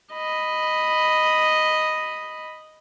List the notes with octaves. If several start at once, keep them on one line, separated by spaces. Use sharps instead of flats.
D#5 B5